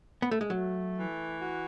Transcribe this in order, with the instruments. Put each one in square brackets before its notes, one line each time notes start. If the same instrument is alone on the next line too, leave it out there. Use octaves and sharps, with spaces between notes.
[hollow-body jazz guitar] B3
A3
G#3
[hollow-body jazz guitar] F#3 [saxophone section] A3
[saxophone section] E3
F#4